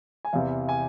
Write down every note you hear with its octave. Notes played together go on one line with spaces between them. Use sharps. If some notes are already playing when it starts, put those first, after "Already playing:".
G#5
E2 C3 E3 F5
G#5